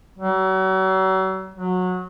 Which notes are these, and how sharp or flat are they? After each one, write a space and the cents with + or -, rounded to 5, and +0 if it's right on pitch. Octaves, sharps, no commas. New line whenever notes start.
F#3 +40
F#3 -20